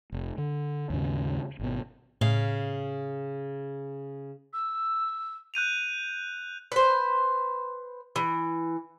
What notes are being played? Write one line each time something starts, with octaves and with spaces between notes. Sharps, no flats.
F1
D3
D#2 G#2 C#3
G#1 B2
A2 C#3 F5
E6
F#6 G6 D#7 F7
B4 C5
E3